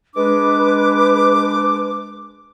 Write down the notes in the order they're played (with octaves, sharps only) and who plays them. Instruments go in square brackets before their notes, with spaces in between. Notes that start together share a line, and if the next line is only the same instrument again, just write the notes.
[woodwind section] G#3 D4 D6 [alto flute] B4